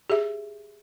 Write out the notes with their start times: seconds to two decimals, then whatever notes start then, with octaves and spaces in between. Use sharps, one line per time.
0.10 G4 G#4 E5